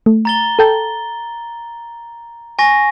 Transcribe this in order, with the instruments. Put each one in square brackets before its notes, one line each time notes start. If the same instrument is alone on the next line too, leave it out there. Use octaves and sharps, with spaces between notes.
[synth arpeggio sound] A3
[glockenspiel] A#5 A6 G7
[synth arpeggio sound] A4 G5 A5
[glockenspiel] G#5 C#6 A#6